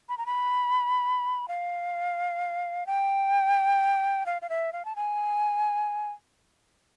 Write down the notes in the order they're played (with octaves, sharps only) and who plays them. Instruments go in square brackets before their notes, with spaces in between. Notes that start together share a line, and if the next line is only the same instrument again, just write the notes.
[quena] B5
A#5
B5
F5
G5
F5
F5
E5
F5
A5
G#5